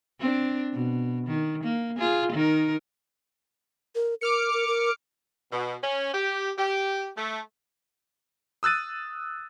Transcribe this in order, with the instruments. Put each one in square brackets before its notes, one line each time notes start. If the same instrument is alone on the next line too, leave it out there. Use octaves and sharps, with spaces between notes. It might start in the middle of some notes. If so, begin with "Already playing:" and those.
[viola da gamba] C4 D4
B2
D#3
A#3
F4 G#4
D#3 D#4 A#4
[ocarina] A#4
[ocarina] A#4 [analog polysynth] D6 F6 C#7
[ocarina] A#4
A#4
[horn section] B2
C#4
G4
G4
A3
[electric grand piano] D#6 E6 F#6 A6 D#7